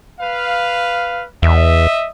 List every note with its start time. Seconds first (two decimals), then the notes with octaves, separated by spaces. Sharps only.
0.20 B4 F5
1.42 E2 D#5 E5